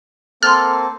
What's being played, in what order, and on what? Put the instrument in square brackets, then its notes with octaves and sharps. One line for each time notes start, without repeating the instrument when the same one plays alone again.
[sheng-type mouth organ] A#3 C4 A4 [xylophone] C6 A6 [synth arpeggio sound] F6